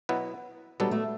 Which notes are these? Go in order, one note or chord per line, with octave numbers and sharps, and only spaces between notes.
B2 F#3 B3 E4 B4
B2 F#3 G3 B3 D4 A4
A3